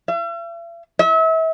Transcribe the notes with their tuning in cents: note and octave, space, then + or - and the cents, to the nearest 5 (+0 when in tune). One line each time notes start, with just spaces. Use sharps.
E5 +45
E5 -35